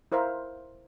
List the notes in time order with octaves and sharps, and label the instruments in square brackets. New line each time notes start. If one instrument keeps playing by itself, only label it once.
[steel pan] E4 A#4 C5 E5 F5